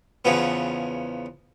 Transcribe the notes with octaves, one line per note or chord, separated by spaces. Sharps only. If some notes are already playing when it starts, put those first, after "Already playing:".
E2 C#3 F3 B3